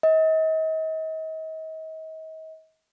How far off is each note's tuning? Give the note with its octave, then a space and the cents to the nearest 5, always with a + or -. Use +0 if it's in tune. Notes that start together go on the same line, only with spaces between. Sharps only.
D#5 +40